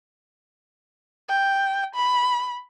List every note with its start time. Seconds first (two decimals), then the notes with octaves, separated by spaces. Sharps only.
1.29 G5
1.95 B5